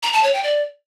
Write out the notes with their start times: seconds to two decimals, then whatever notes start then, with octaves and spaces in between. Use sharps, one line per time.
0.03 A#5
0.13 A5
0.23 C#5
0.33 G5
0.43 D5